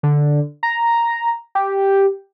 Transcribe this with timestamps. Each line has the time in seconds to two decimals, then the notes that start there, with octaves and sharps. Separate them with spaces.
0.03 D3
0.63 A#5
1.55 G4